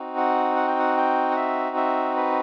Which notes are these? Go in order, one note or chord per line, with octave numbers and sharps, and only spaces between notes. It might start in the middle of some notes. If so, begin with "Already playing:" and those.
Already playing: C4 D#4 F#4
F#5
F#5
G5
F#5
G5
F#5
E5
E5
B4